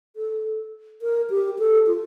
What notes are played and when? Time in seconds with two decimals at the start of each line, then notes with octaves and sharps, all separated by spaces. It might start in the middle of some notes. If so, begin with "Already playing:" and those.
0.16 A4
1.02 A#4
1.30 G4
1.59 A4
1.87 F4